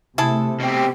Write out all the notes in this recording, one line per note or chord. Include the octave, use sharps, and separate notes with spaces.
C3 A3 E4 G#4 A4
B2 C4 G4